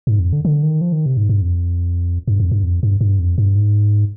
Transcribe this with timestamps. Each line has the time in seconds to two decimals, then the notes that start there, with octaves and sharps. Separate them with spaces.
0.07 G#2
0.19 F2
0.33 D3
0.45 D3
0.63 D#3
0.81 F3
0.92 D#3
1.06 C3
1.17 G#2
1.29 G2
1.42 F2
2.28 G2
2.40 F2
2.51 G2
2.63 F2
2.83 G2
3.01 G2
3.19 F2
3.38 G2
3.55 G#2